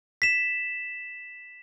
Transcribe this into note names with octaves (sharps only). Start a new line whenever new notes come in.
B6 E7